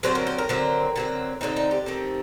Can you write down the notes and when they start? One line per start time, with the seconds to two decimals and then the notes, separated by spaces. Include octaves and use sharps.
0.03 D3 F#3 C4 C5
0.15 A#4
0.27 C5
0.38 A#4
0.49 D3 F#3 C4
0.96 D3 F#3 C4
1.41 D3 F#3 C4 D#4
1.57 D#4
1.71 G4
1.86 D#3 A3 C4